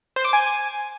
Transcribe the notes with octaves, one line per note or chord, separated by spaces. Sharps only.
C5
D6
G#5